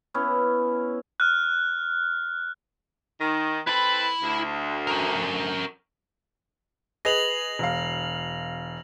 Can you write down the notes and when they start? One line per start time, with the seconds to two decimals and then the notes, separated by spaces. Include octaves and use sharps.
0.14 B3 C#4 E4
1.20 F6 F#6
3.21 D#3
3.67 C4 E4 A4 B4 B5
4.23 D2
4.87 C#4 A#4
7.05 G#4 B4 D#5 A#6 F7 F#7
7.59 E1 F5